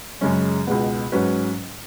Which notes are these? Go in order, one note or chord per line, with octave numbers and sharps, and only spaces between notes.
F#2 C#3 G#3 C#4
C#2 B2 G#3 B3
G#2 F#3 C#4 B4